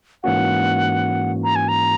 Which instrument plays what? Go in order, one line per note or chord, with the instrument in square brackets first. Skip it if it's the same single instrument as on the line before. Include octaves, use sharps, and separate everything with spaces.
[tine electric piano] G#2 E3 A#3 C#4 F#4 [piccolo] F#5
[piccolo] A#5
G#5
A#5